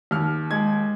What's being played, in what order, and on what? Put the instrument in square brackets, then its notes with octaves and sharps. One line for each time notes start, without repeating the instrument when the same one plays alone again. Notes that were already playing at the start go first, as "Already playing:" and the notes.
[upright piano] D#2 F6
G#3 G#6